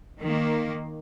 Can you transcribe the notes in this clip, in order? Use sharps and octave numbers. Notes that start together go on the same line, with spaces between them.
D#3 A#3